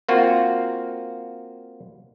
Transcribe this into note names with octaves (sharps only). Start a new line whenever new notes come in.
A#3 C4 F4 F#4 A#4